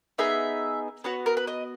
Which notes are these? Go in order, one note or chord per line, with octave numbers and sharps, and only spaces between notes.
B3 D#4 G#4 E5
B3 F#4 C#5
A#4
B4
D#5